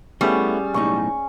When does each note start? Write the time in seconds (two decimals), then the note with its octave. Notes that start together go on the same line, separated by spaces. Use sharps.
0.21 G3 A3 B3 C#4 E4 G#4
0.74 B1 A2 D#4 C#6